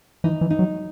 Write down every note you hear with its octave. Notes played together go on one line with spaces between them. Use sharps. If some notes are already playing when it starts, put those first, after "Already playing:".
E3 D#4
E3
D#4
F#3